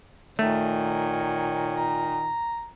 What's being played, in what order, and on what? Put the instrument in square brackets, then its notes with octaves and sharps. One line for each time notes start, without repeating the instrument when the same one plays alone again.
[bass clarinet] A#2 [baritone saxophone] D#3 [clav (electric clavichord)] A3 [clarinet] C#5
[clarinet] A#5